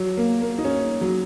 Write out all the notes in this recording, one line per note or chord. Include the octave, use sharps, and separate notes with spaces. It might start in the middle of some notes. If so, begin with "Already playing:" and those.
Already playing: F#3
A#3
A#3
D#4
C#4
F#3